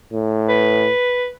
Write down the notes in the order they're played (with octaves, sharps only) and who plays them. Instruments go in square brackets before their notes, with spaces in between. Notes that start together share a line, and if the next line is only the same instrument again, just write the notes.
[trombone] A2
[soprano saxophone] B4